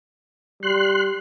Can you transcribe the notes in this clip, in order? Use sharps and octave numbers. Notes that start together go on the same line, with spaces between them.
G3 C6 F#6